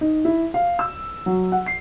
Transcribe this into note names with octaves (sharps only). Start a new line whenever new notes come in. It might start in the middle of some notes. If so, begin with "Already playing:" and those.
D#4
E4
F5
E6
F#3
F#5
C7